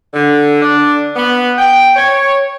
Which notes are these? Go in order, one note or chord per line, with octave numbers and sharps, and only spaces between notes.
D3
D4
B3
G5
C#5